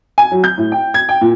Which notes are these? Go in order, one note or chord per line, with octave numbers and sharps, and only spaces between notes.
G#5
F#3
G6
A2
G5
G#6
G5
A#2